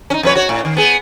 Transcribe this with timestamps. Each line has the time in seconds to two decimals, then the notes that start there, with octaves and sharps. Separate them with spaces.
0.10 C#4 D#4
0.23 F2 B4 C#5
0.35 F#4 C#5
0.49 A2
0.65 D#3
0.77 B3 G#4